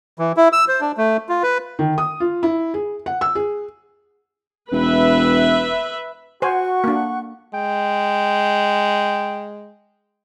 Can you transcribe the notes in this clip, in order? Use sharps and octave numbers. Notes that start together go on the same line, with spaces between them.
E3
E4
E6
C5
D4
A3
F4
B4
D#3
D#6
F4
E4
G#4
F#5
E6
G#4
E1 B4 E5
F#4 C5 F#5 G#5 C#6 F#6
A#3 D4
G#3 G5